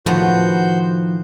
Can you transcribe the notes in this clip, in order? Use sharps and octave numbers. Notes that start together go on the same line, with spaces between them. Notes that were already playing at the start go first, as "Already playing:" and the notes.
A2 D#3 F3 B3 F#4 C5 G6